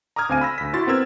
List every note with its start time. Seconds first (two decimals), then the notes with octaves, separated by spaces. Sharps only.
0.16 A#5 D6 D#6 F6 G#6
0.29 D2 C4 F5 G#5 D#7
0.41 B5 E6 A#6
0.58 D2 B6
0.73 E4 F#4 C6 A6
0.87 B3 C4 A#4 E6 G#6